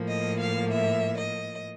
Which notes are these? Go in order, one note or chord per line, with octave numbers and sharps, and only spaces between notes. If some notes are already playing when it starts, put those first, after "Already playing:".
Already playing: A2 F3 A#3
D#5
F5
E5
D#5